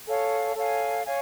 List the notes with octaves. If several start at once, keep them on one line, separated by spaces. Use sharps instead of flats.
A4 C#5 F5 G#5
A4 C#5 F5 G#5
C#5 F5 G#5